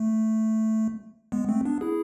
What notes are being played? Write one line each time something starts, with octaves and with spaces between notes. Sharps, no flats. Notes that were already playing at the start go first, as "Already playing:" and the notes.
Already playing: A3
G#3 B3
A3 C4
B3 D4
E4 G#4